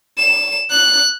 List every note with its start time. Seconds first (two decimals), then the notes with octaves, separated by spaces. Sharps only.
0.17 E7
0.70 F#6